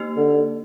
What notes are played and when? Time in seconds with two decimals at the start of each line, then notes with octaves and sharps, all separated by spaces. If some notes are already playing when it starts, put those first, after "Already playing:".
Already playing: A#3 D#4 G4 C5
0.17 D3